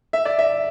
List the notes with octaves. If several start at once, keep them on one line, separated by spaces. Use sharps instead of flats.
E5
D5
E5